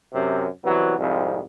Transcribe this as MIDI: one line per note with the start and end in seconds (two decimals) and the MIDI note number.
0.14 0.46 42
0.14 0.46 48
0.64 0.98 36
0.64 0.98 52
0.64 0.98 54
0.64 0.98 59
0.98 1.40 36
0.98 1.40 41
0.98 1.40 44
0.98 1.40 53